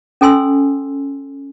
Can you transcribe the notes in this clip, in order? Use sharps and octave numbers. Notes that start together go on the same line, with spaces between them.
C#4 A4 G#5 C6 E6